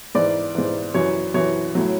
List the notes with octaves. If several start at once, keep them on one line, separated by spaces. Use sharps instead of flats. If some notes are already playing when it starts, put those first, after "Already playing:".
G#2 E3 D5
G#2 E3
F#2 E3 C#5
F#2 E3 C#5
A2 F#3